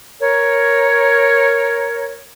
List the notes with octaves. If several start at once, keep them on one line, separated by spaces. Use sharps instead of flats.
A#4 C#5